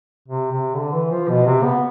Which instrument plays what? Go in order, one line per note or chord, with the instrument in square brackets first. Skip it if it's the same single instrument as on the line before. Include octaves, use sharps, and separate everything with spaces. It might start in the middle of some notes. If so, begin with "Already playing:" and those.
[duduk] C3
C3
D3
E3
F3
B2
C3
B3